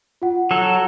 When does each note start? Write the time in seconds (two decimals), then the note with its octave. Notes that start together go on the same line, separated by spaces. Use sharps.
0.22 F4 F#5
0.51 F#3 A4